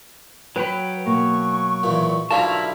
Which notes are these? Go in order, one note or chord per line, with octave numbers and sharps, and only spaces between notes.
F#3 B4 G5 B5
B2 A#3 B3 C#6
E2 A#2
B1 D3 F3 E4 A#4 F5 A5